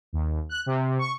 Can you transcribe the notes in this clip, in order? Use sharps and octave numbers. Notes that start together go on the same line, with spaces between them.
D#2
F#6
C3
C#6